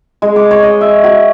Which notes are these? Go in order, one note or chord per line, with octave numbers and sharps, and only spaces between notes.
G#3
D6
C#5
D#5
E5
F#4